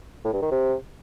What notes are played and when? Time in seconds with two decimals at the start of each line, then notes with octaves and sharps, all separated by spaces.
0.24 A2
0.33 G2
0.42 D#3
0.51 C3